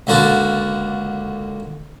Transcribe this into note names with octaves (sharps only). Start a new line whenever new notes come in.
C#2 D3 A#3 F#4 A5